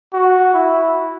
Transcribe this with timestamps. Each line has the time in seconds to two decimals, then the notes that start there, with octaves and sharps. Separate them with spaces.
0.13 F#4
0.54 E4